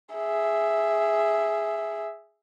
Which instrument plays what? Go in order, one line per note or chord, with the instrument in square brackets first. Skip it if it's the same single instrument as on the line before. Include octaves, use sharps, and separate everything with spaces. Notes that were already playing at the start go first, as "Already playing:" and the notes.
[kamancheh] G#4 E5